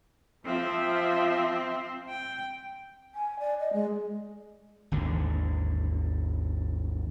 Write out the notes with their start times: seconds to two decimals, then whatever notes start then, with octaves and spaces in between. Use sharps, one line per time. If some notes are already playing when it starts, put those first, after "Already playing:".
0.45 F3 C4 E5
2.09 G5
3.15 G#5
3.39 D5
3.60 D#5
3.73 G#3
4.92 G#1 D#2 D3